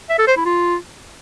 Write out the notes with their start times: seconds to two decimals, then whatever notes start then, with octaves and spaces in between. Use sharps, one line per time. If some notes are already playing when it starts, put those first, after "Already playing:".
0.09 E5
0.18 A4
0.27 C5
0.36 E4
0.45 F4